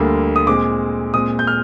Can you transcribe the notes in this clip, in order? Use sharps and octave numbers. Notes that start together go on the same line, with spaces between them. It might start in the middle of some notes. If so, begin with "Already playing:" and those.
Already playing: D2 D3 G3 A#3
D#6
A#2 G#3 C4 D6
A#2 G#3 C4 D#6
G6
F6